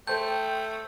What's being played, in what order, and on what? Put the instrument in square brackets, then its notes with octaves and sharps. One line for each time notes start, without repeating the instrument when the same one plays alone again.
[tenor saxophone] A3 [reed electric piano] A4 C5 A5 [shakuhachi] G5 [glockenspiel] G6